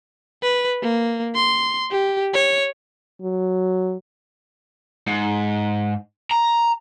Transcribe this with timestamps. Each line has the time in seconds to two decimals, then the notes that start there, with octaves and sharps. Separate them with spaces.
0.42 B4
0.82 A#3
1.35 C6
1.91 G4
2.34 C#5
3.22 F#3
5.07 G#2
6.31 A#5